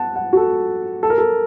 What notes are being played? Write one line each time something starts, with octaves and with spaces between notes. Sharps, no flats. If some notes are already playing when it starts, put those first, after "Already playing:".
Already playing: F#5 A5
F#5
F#4
A4
A4
A#4
A4